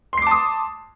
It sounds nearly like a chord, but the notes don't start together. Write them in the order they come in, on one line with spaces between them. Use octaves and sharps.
C6 C7 D6 A5 D#6